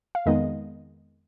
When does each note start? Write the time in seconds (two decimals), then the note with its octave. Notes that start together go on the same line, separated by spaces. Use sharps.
0.15 F5
0.26 F2 D#3 G#3 B3 D#4 D#5